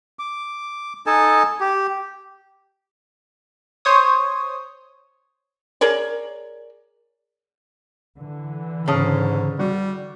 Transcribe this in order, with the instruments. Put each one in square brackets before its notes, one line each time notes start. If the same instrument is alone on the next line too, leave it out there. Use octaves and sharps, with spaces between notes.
[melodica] D6
D#4 A4 G#5 A5
G4
[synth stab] C5 C#5 D#6
[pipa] G#4 A#4 C#5 D5
[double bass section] D3 E3
[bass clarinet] G#2 [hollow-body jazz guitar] C#3 [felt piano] A5 D#6 F6
[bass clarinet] G3 [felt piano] F#4